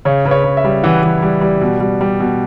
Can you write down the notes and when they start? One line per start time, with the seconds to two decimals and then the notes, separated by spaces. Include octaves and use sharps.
0.05 C#3 C#5
0.25 C#3 B4
0.31 C#5
0.44 C#3
0.57 E5
0.64 G3
0.83 E3 F#5
1.03 E3
1.22 G3
1.41 G3
1.61 B2
1.80 G3
2.01 G3
2.20 B2